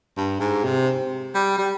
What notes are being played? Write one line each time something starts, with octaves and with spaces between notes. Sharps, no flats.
G2
G#2
C3
G3
G3